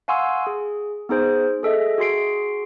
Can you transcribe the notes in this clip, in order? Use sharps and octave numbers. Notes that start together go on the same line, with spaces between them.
F5 F#5 G#5 C6 C#6 E6
G#4
B3 D#4 G#4 C5
G#4 A4 D#5 E5
F#4 G#4 C6 C7 D7